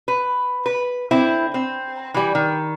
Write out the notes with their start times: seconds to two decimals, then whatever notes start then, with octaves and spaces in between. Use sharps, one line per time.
0.08 B4
0.66 B4
1.11 D3 C4 E4
1.54 C4
2.14 E3 G3
2.35 D#3